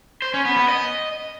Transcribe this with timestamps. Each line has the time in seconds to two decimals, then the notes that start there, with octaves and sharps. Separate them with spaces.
0.22 C5
0.34 C#4
0.45 B3
0.57 B3
0.68 D#5